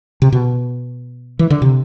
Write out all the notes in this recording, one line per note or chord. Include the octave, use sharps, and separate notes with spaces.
C3
B2
E3
D3
C3